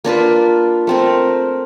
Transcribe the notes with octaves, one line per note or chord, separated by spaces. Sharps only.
A#3 D4 F4 B4
A3 C4 A#4